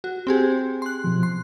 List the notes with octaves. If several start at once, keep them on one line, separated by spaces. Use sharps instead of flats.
F#4
C4 G4 G#4
C6 F#6
B2 F3
C6